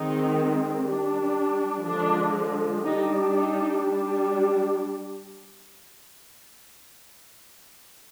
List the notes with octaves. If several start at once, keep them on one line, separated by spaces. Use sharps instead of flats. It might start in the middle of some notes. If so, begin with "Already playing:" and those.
Already playing: D#3 G#3 C4 D#4
G3 D4
D3 F3 G#3 D4
G3 D4 D#4
D#4
G3 D4